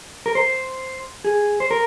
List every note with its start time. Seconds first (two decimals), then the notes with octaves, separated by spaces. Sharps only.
0.26 A#4
0.35 C5
1.25 G#4
1.60 C5
1.71 A#4